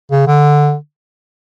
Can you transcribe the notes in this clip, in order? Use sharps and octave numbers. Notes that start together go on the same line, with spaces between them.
C#3
D3